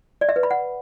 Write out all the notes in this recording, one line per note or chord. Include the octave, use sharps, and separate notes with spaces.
D5
E5
B4
B5
F#5